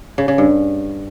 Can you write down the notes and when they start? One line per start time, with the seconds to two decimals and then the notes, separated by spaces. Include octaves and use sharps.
0.18 C#3
0.28 C#3
0.38 G2